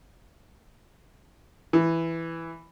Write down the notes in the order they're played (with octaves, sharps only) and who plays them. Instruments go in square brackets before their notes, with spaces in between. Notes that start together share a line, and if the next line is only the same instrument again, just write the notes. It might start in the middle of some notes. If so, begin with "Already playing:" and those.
[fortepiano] E3